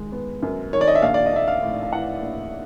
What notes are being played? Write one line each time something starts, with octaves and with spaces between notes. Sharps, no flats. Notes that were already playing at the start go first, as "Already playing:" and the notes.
Already playing: D#3 G#3
B3
F#2
D#3 C#5
D5
D#5
E5
A#1 F5
D5
D#5
A#1 E5
F5
A2
F5
E3 F#5
A#1